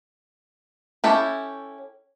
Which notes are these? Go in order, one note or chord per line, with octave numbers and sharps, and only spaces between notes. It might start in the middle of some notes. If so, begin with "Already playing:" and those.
C#4 E4 G4 A4